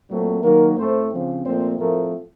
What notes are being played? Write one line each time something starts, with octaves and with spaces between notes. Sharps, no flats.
A#2 F#3 A3 C4
D#3 F#3 A#3 A#4
A2 A3 C4 C5
C#3 F3 C4
A#2 F3 A3 C4 C5
A2 F3 A3 C4 A#4